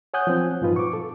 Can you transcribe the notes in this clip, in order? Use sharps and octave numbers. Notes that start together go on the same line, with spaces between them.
C#5 F#5 G#5 D#6 F#6 G6
F3 C4
G2 A#2 F3 D#4 F4 B4
C#6 D6
A4